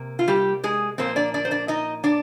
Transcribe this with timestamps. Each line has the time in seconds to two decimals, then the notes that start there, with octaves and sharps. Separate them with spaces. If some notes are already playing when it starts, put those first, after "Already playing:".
Already playing: C3 A#3
0.19 F4
0.28 G3 G4
0.64 G#3 G#4
0.98 A#2 F3 A#3 C4 C5
1.16 D4 D5
1.34 D4 D5
1.45 C5
1.51 D4 D5
1.68 D#4 D#5
2.04 D4 D5